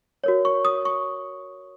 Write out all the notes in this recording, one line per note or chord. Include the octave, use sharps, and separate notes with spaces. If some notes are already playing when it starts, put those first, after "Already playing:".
F#4 A#4 C#5
C#6
D#6
C#6